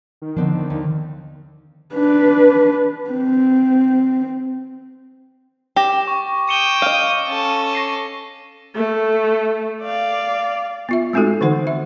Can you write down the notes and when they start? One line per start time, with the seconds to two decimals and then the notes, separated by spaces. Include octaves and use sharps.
0.22 D#3
0.36 D3 F3 B3 C4 D4
0.70 D#2
1.95 D4 B4
3.10 C4
5.76 G4 D6 A#6 E7
6.07 C#6
6.49 G5 D#6 C#7 E7 G7
6.82 D#5 F5
7.28 C#4 A4
7.73 A#6 C7 D#7
8.76 A3
9.82 D5 F5
10.89 B3 F4 E5
11.13 G#3 A3 C4 D#4 F#4 A4
11.41 D3 E3 D#4 C5 F#5
11.67 E5